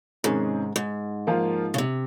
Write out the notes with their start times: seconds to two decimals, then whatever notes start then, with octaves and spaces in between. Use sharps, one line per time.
0.24 G#2 C3 D#3 G#3 C#4 G#4
0.76 G#2
1.27 F3 A#3 F4
1.74 C#3
1.78 C3